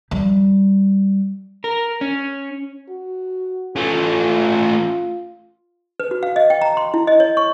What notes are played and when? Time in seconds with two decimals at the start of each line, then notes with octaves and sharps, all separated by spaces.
0.11 G3
1.64 A#4
2.01 C#4
2.90 F#4
3.76 A3 C#4 F4
6.00 B4
6.11 F#4
6.23 F5
6.36 D#5
6.50 G5
6.62 A#5
6.77 C6
6.94 E4
7.07 D#5
7.20 C#5
7.37 C#6